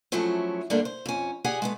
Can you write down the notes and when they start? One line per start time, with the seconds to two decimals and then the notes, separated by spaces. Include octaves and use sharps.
0.12 F3 F#3 A3 C#4 E4
0.70 G2 D3 G3 A3 A#3 D4
0.85 C5
1.06 F2 C#4
1.44 G4 G#4 D5 F#5 G#5
1.62 G#3 A3 B3